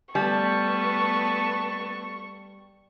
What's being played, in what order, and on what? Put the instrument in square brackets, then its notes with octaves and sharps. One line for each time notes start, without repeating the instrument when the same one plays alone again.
[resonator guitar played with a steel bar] G3 [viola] A3 B3 [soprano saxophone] A5 [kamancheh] C#6